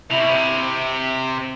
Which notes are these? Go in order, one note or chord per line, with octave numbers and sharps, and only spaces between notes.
C3 E4
B2
C3